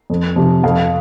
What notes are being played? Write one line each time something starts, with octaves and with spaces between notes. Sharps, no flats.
F2
C3 F3
F2 F5